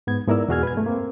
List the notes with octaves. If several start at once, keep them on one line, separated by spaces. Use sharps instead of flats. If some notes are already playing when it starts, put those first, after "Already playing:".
G#2 B3 G#6
G#2 B3 E4 A#4 D5 E6
E2 B2 F#4 G#4 F6 G#6
B4 G#6
G2 A3
A#3 C4